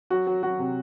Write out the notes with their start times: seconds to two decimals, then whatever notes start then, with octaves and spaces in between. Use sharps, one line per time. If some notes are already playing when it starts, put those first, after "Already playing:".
0.10 F#3 F#4
0.27 F#3
0.43 F#3 F#4
0.59 C3